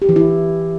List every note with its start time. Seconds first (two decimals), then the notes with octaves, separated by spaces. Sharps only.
0.02 G4
0.09 E3
0.16 E4